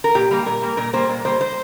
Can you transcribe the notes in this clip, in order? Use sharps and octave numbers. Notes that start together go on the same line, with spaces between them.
A#4
A#2 G4
G3 A#3
A#2 A#4
G3 A#3
A#2 A#4
G3 A#3 C5
A#2
G3 A#3 C5
C5